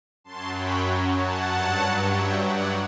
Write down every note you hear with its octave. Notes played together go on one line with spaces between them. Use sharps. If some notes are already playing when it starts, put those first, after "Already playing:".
F#2 F#3 A5 C6
G5 B5
F#5 A5
G2 F#3
E5 G5
D5 F#5